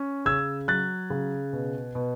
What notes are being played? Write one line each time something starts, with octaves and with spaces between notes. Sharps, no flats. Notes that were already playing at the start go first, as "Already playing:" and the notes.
Already playing: C#4
C#3 E6 G#6
F#3 F#6 A6
C#3
B2
B2